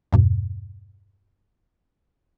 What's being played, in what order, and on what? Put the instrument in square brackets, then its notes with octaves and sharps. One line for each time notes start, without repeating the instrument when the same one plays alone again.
[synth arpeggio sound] E2 G2 B2